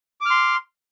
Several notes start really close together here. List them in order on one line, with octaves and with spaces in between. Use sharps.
D6 F6 C6